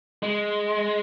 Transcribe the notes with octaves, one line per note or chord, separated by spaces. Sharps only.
G#3